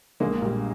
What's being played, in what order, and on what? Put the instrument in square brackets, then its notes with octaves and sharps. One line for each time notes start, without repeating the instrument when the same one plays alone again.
[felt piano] A#1 [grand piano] G#3 A#3
[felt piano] A#2 G3